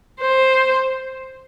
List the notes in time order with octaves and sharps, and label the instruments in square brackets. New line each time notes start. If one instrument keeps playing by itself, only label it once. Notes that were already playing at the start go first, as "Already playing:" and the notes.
[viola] C5